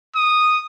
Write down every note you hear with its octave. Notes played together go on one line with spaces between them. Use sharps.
D#6